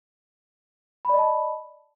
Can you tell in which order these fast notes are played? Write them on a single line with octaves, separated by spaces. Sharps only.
B5 D5 D#5 A5